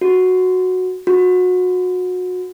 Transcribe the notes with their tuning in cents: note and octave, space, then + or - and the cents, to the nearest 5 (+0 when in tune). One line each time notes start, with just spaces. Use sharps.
F#4 -5
F#4 -25